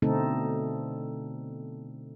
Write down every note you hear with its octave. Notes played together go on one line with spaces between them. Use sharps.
B2 D3 A3 C4 D#4 A4